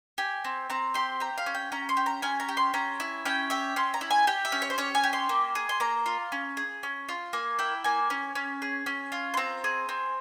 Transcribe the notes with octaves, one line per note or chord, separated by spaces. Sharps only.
G4 G#5
C4
C4 A#5
G4 C6
G4 A#5
F5
C#4
G5
C#4 A#5
C6
G4
A#5
C#4 G#5
A#5
G4
C6
C#4 A#5
E4
C#4 G5
G4 E5
C#4 C6
A#5
E4
G#5
G4 G5
E5
C#4
C#5
C5
C#4 C#5
G#5
G4
C6
A#3
G#4
C6
A#3 A#5
F4
C#4
G#4
C#4
F4
A#3 G#5
E4 G5
A#3 G#5
C#4
C#4
G#4
C#4
F4
C6
C4 A#5
G#4
C4